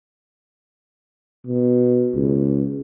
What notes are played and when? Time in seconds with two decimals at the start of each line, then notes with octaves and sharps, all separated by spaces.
1.47 B2
2.14 C#2